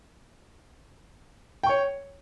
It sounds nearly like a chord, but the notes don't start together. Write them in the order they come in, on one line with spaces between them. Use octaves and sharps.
G5 C#6 C#5